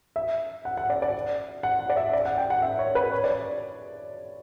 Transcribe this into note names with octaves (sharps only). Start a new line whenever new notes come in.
E5
F#5
F#5
D5
D5
F#5
F#5
D5
E5
D5
F#5
G5
F#5
E5
C#5
B4
C#5
D5